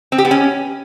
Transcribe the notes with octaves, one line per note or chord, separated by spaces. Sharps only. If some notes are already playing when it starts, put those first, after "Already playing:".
C4
G4
B3
C#4